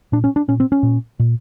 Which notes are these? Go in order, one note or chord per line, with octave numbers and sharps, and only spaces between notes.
A#2 D4
C#4
D4
A#2 C#4
C4
C#4
A#2
A#2